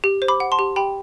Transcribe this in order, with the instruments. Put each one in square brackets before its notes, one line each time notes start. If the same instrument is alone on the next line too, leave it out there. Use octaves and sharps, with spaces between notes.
[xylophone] G4
C5
B5 D6
F#5
A5 C6
G4
G4 G5 B5